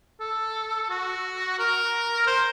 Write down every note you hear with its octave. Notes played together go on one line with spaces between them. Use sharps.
A4
A4
F#4
A#4
C5